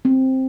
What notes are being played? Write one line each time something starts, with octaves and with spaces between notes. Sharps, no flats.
C4